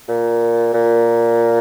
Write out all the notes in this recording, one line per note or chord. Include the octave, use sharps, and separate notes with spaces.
A#2
A#2